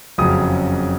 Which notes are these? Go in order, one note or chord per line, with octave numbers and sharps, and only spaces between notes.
F#1 F2 C#3 F#3 D#6